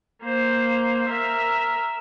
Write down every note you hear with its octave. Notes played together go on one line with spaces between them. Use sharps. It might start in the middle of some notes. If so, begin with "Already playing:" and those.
A#3 C5
A#4 E5